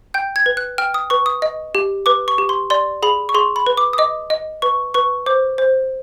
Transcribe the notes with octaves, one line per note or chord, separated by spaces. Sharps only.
G5 G6
G#6
B4
F#6
G5 F6
D#6
B4 C#6
D#6
D#5
G4
B4 D6
C#6
G4
C6
D5 C6
G#4 B5
C#6
G#4 C6
B5
B4
D6
D#6
D#5 D6
D#5
B4 C#6
B4 C#6
C5 D6
C5